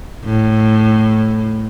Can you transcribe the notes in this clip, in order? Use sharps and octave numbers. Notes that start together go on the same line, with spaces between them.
A2